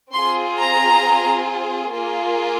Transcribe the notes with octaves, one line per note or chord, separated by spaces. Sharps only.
C4 F4 G#4 C6
A#5
A#3 F4 G#4